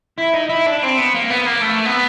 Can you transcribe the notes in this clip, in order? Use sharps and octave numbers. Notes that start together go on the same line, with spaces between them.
E4
D#4
E4
D4
C4
B3
A#3
B3
A#3
A3
B3